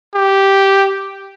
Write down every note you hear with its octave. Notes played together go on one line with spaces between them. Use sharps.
G4